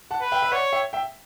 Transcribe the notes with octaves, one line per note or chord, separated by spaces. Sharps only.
F#5 A5
B4
E5 G5
E5
C#5 D5 F#5
E5 G5
E5 G5